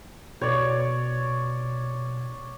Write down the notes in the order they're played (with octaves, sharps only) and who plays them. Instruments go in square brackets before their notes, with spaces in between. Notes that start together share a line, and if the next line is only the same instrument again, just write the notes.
[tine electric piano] B2 [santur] C#5 D5